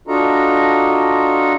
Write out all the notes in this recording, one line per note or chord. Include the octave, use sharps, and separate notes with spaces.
D4 F4 F#4 A4 D#5 A#5